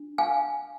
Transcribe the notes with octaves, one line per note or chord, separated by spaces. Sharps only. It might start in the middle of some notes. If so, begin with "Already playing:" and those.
Already playing: D4
F5 G#5